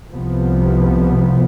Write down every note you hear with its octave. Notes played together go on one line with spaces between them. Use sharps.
C2 C3 F3 B3